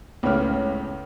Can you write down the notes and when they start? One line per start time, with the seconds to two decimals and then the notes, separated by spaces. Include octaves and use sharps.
0.23 C#2 A2 C#3 B4 C#5 F6